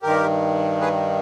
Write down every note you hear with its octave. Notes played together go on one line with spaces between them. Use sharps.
G2 D#3 G4 A#4
G#4 B4